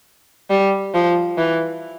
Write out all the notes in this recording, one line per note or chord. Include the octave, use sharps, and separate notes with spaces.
G3
F3
E3